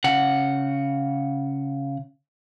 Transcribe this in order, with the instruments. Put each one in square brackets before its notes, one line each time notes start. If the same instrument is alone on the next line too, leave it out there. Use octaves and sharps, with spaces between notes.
[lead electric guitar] C#3 F#5